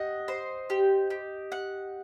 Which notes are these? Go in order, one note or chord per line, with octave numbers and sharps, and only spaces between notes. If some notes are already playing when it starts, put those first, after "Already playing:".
Already playing: G4 D#5 F#5
C5
G4
G4
F#5